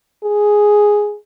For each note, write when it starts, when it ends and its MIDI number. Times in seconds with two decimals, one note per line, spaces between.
0.24 1.16 68